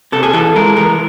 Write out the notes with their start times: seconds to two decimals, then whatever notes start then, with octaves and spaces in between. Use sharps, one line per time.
0.12 C3 A4
0.23 G#4
0.33 E3 A4
0.56 G#3 A#4
0.76 E3 A#4